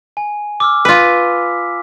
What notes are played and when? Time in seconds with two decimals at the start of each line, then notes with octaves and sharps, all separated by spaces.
0.17 G#5
0.60 D6 E6 F6
0.85 F4 B4 B6